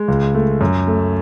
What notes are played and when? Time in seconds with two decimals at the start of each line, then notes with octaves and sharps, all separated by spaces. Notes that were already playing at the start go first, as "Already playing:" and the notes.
Already playing: G#3
0.08 C#2
0.34 A3
0.61 F#2
0.87 A3